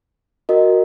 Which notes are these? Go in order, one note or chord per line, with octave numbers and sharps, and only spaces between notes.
F#4 A#4 D#5